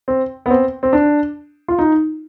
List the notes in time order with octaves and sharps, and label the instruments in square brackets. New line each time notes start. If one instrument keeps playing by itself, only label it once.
[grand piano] C4
B3
C4
C4
D4
F4
D#4